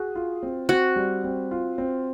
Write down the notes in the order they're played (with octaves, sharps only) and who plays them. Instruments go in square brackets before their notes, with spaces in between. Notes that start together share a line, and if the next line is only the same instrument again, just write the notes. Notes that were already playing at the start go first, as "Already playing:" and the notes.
Already playing: [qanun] F#4 [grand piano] G#4
[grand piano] F4
C4
[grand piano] C4 [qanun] F#4
[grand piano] G3
C4
F4
C4